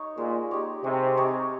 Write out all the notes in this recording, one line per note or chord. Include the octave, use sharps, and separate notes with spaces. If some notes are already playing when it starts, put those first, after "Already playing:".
Already playing: D#4 C#5
A#2 G#3
D#4 G4 C#5
C3 G#3
D#4 G4 C#5